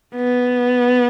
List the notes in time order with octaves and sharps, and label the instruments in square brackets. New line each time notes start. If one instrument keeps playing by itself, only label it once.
[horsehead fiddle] B3